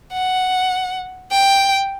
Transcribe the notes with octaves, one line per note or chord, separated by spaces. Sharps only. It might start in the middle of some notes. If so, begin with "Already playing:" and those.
F#5
G5